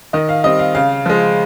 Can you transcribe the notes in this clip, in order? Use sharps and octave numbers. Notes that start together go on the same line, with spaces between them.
D#3 D#5
F5
G3 C4 D#5
F5
C#3 F5
F3 G#3